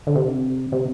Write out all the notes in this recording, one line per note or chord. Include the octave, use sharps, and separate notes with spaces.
D3
C3
C3